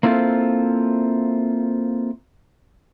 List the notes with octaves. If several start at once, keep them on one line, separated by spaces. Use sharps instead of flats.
A#3 C4 E4 F4 A4 C5